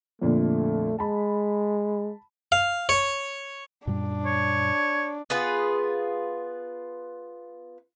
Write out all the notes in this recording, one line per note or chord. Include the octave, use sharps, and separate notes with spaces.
F2 A#2 D3 A3
G#3 A5 B5
F5
C#5
F#2 A#2 G3 D4
C#5
B3 F4 G#4 B4